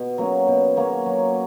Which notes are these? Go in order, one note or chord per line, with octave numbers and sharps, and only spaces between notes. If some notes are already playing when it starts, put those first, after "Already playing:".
Already playing: B2
F#3 A#3 C#4
B2
F#3 A#3 C#4
F#3